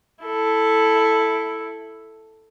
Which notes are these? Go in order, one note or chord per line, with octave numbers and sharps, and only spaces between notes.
E4 A4